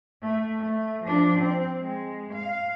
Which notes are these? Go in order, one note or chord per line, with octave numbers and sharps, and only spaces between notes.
A3
A3
F3 D4
C4
G#3
F5